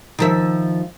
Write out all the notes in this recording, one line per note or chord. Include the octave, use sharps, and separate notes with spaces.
D#3 F3 E5